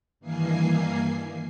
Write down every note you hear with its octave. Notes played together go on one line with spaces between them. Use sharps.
G2 D#3 E3 A#3 G#5 C7